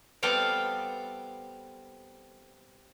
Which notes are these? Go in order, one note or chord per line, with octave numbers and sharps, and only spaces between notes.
G3 B3 C4 A4 F5 G5